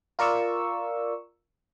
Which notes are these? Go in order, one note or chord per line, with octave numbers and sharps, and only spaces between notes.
F4 A#4 D5 C#6 E6